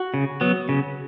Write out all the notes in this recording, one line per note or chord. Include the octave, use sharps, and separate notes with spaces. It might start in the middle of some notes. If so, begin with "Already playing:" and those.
Already playing: F#4
C#3
F#3 B3
C#3